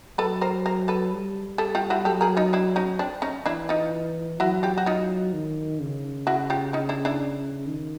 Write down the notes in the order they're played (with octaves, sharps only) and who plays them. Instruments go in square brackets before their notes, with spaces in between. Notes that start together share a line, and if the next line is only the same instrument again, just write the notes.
[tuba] F#3 [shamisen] A4 B4
[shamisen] A#4 C5
A#4 C5
A4 B4
[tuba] G3
[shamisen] G4 A4
F4 G4
E4 F#4
[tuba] F#3 [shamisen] G4 A4
[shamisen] G#4 A#4
D#4 F4
D4 E4
C#4 D#4
C4 D4
C#4 D#4
[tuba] E3 [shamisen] D4 E4
[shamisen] D#4 F4
[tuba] F#3 [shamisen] E4 F#4
[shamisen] F4 G4
F#4
D#4 F4
[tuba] D#3
C#3
[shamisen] E4 F#4
F4 G4
D#4 F4
D4 E4
D4 E4
[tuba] D#3